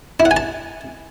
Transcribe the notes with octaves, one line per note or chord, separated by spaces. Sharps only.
E4
F#5
G#5
A5